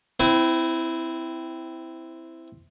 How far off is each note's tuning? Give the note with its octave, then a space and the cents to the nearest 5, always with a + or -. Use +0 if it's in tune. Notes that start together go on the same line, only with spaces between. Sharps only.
C4 -10 E4 +0 B4 +45